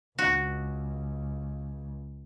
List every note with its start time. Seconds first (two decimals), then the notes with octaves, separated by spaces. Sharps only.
0.19 C#2 F#4